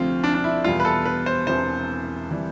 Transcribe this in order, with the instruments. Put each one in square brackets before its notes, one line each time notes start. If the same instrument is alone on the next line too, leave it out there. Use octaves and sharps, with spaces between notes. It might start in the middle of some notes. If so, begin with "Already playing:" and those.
Already playing: [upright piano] D2 C3 F3 C4 [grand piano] F4
[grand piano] D4
D4
E4
[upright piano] E2 B2 G3 B3 E4 [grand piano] F4
[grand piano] B4
A4
B4
C5
[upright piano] E1 E2 C3 E3 [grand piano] C5
[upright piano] C3 E3 G3